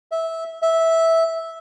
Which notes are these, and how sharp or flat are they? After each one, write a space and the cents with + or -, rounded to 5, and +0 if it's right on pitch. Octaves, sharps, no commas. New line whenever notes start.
E5 -15
E5 -10